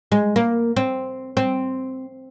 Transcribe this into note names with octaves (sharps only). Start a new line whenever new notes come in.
G#3
A#3
C4
C4